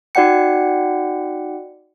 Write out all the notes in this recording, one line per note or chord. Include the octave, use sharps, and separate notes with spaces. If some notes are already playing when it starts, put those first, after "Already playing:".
D#4 F#4 D5 F#5 G5 C#7